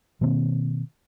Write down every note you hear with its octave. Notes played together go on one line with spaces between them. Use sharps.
B2 D#3 A#3 C4